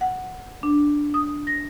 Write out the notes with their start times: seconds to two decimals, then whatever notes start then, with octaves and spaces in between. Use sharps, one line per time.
0.01 F#5
0.63 D4
1.14 D#6
1.47 A#6